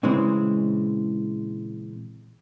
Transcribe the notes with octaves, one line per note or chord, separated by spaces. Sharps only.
A#2 C#3 E3 G#3 C4